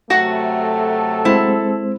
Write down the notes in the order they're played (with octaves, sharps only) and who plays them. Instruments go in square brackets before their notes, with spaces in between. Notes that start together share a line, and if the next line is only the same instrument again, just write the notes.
[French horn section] C3 F#3 A3 [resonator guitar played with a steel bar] F#4 F#5 [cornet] A4
[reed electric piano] G#3 C4 C5 [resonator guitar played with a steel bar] E4